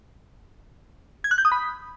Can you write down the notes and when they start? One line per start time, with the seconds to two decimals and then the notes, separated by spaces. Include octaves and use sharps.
1.24 G#6
1.31 F#6
1.38 G6
1.45 D#6
1.52 B5